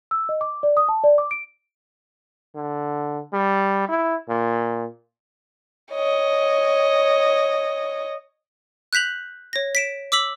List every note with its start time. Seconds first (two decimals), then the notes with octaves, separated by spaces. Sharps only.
0.11 E6
0.29 D#5
0.41 D6
0.63 D5
0.77 D#6
0.89 A5
1.04 D5
1.18 D6
1.31 D7
2.56 D3
3.33 G3
3.89 E4
4.30 A#2
5.92 C#5 D#5
8.93 F#6 G6 B6 F7 F#7
9.53 C#5 A#6
9.75 B6 D7 E7
10.12 D6 E6 B6 F#7